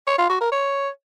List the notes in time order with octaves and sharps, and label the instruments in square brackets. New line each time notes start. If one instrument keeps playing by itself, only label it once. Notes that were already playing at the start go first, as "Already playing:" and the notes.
[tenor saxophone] C#5
F4
F#4
A#4
C#5